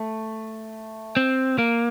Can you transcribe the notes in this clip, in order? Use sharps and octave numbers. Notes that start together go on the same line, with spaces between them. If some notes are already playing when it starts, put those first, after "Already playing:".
Already playing: A3
C4
A#3